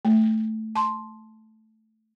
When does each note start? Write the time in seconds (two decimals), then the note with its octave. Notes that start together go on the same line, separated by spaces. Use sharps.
0.05 A3
0.75 A5 C6